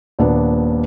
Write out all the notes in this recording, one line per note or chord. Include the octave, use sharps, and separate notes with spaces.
D#1 A#2 B3 D4